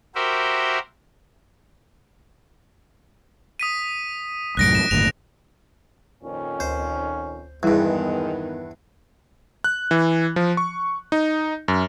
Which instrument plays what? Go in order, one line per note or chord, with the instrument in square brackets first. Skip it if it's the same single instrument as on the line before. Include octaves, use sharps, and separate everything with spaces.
[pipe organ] F#4 G4 A#4 C5 E5
[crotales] D#6 B6 D#7
[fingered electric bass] C2 F#2 A2 [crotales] F#6 A#6 D7
[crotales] E7
[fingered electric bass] G1 D#2 A2 [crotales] F7
[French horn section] F2 A#2 D#3 [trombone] C#4
[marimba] D2 [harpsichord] C5
[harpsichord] E2 G2 [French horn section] D#3 B3 [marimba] G3 E4 G#4 [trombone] G#3
[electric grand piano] F#6
E3
F3
C#6
D#4
F#2